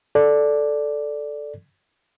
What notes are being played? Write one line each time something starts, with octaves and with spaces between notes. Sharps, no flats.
A4 D5